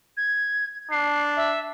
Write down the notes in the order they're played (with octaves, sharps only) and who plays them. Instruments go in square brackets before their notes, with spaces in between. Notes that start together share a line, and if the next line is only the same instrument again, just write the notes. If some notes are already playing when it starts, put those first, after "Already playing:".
[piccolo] G#6
[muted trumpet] D4 [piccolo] C7
[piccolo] E5